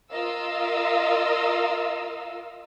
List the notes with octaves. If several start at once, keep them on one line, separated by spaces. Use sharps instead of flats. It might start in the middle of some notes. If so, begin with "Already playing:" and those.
F4 A#4 D#5 F5 E6